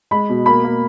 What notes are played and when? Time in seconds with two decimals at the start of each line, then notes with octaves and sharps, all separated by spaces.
0.11 G#3 B5
0.29 B2
0.46 A#3 B5
0.64 A#3